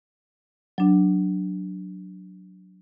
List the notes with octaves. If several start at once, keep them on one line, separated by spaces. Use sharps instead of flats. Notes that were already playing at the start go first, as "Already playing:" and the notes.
F#3 D4